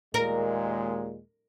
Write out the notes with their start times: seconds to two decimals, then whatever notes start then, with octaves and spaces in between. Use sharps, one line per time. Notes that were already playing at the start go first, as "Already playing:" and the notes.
0.14 D#2 A#2 G#3 A#4